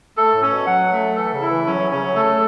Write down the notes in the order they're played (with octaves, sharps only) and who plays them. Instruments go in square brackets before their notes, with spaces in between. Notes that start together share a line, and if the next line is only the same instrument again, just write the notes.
[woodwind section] A3 [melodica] A4
[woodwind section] A2
[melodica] C#4
[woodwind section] B2
[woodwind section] F#3 [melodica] F#5
[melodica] A3
[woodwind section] E3 [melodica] A4
[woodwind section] C#3
[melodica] E4
[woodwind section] E3
[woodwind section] F#3 [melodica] C#4
[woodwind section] F#3
[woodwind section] C#3 [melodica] C#4
[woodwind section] F#3
[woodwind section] A3 [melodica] A4